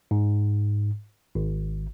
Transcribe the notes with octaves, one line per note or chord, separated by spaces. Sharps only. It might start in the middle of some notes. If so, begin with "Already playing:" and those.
G#2
G#1